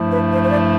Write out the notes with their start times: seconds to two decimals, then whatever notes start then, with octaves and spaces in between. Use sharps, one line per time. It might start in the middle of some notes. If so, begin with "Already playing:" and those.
Already playing: G2 F3 A3 E4
0.12 B4
0.33 C5
0.44 C5
0.52 D5